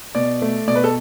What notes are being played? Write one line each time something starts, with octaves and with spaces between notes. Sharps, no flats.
B2 D5
A3
B2 D5
B4
A4